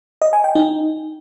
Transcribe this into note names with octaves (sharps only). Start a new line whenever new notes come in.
D#5
G#5
G5
D#4